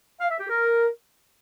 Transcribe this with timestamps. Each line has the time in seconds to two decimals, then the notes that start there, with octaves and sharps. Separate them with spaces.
0.20 F5
0.30 E5
0.39 G4
0.49 A#4